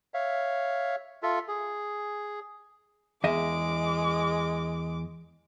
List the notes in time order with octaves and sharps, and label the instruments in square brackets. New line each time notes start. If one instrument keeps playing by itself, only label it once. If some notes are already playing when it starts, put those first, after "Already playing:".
[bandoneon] C#5 E5 F5
F4 A4 E5
G#4
[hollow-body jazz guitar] E2 D#5 E5 [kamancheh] G#3 D6